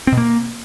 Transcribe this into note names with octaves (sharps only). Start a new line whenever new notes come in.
C4
B2
A#3